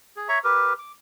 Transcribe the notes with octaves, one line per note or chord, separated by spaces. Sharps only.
G#4
C#5 E5 A#5 C#6
G4 A#4 B4
D6